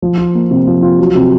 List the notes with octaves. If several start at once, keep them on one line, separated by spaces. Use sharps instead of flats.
F3
F4
A#3
C3
F3
F4
F#3
C3